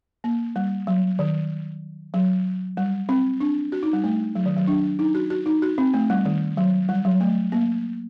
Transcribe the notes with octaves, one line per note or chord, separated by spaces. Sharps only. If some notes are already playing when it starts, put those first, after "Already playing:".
A#3
G3
F#3
D#3
F#3
G3
C4
D4
F#4
D#4
G3
A3
F#3
D#3
F#3
D4
D#4
F#4
F#4
D#4
F#4
C4
A3
G3
D#3
F#3
G3
F#3
A3
A#3